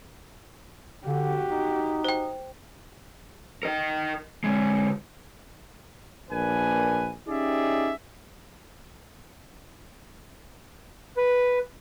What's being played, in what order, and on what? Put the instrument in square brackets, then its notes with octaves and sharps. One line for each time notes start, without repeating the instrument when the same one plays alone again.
[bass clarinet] D3 [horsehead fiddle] F#4 G4
[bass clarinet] D#4
[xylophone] C5 G5
[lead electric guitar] A#4 D#5
D3 G#3
[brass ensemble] A#1 A#3 D4 B4 G#5
C#4 D#4 G4 G#4 D5 E5
[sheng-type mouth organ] B4